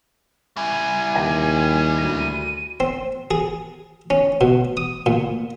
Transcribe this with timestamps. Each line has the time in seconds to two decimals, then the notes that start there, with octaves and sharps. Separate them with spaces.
0.57 G3 E4 G#5
1.16 D#2 G5 A#6
1.98 D2 A#6 D#7
2.80 C4
3.31 G#4
4.10 C#4
4.41 B2
4.77 D#6
5.06 A#2